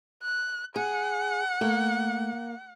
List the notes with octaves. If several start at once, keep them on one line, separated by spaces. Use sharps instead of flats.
F#6
G#4 F#5
A3 A#3